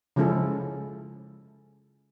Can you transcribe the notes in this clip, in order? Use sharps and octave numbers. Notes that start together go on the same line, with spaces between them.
C#3 F3 G#3 C#4 E4 A4